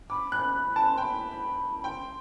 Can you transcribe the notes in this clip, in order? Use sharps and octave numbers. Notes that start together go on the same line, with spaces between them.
B5 D6
F#6
A5
C6
G5 B5
B5
G5 C6